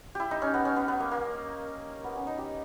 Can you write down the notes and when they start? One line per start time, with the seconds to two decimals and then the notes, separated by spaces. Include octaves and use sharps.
0.15 E4 G4
0.31 D#4
0.42 C#4
0.54 B3
0.65 C#4
0.76 B3
0.88 B3
1.00 A#3
1.11 A#3
2.04 B3
2.15 C#4
2.27 D#4
2.38 G4